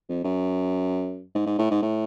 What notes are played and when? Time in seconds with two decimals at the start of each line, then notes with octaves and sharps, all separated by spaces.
0.09 F2
0.24 F#2
1.35 G#2
1.46 G#2
1.58 A2
1.71 G#2
1.82 A2